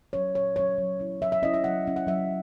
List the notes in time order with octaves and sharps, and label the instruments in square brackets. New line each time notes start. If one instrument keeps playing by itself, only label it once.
[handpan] F#3 C#4 C#5
A#2 C#5
F#3 C#4 C#5
F#3
C#4 E4
F#3 E5
E5
C#4 E4 D#5
E5
F#3 F#5
C#4 E4
F#5
F#3 E5